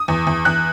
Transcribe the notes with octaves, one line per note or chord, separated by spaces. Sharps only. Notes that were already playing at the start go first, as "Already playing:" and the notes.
Already playing: D#6
E2
E2
E2 F#6